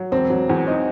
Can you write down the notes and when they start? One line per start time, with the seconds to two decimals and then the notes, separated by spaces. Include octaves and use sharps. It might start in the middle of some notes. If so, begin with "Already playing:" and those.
Already playing: F#3
0.11 E1 C4
0.30 F#3
0.49 E2
0.67 C4 D#4